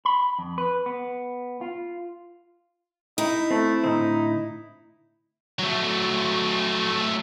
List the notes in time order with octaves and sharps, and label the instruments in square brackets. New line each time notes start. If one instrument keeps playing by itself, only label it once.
[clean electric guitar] B5
F2
B4
B3
F4
[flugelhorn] D#4 [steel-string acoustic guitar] E4
[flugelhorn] A3 [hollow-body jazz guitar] C4
[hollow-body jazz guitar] A2 D3 C4 [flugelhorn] D#4
[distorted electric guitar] F#3 A3